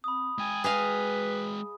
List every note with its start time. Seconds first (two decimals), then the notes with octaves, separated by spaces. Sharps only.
0.04 C4 B5 D#6
0.38 G#3 G5 G#5
0.64 G#4 B4 D#5 F5